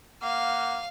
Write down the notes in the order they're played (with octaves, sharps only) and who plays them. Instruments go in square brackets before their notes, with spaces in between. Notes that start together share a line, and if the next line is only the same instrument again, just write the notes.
[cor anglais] A#3 [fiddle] F5 [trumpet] F#5